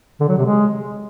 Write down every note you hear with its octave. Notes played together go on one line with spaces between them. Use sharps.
D3
F#3
C3
G#3